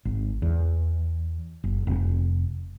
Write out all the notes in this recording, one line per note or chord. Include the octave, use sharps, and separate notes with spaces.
G#1
E2
F#1
F1